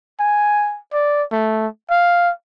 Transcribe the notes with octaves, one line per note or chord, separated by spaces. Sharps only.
G#5
D5
A3
F5